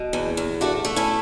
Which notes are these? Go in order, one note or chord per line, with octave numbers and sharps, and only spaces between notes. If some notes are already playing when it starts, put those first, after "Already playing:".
Already playing: B2
E2
E2
A3 D4 F#4
A3
C#4 E4